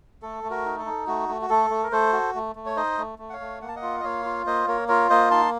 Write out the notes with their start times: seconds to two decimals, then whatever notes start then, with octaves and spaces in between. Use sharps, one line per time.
0.22 A3 A4
0.44 A3
0.50 F#4 A#4
0.65 D#4
0.79 A4
0.86 D#4
1.07 A3 F#4
1.29 A3
1.42 F#4
1.50 A3 A4
1.70 A3
1.83 A#4
1.92 A3 A4 C5
2.13 F#4
2.35 A3
2.56 A3
2.66 C#5
2.76 D#4 C5 D#5
2.98 A3
3.19 A3
3.30 F#5
3.33 C#5 F5
3.40 A3
3.62 A#3 F#5
3.68 A5
3.76 D#5 F#5
3.82 F4
4.00 D#5
4.04 A#3 C#5 F5
4.25 F4
4.46 A#3 C5 D#5
4.68 A#3 A#4 C#5
4.88 F4 A#4 C#5
5.10 A#3 C5 D#5
5.31 D#4 A5 C6